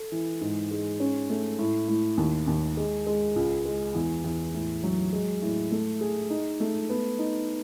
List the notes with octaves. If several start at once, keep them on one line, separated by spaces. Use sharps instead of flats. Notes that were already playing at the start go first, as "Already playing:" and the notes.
Already playing: A4
E3
G#2
G#3
C#4
A3
A2
A2
D#2
D#2
G#3
G#3
C#2
G#3
E2
E2
A2
F#3
G#3
A2
A3
G#4
D#4
A3
B3
D#4